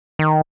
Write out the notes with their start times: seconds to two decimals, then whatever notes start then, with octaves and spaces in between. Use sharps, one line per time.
0.19 D#3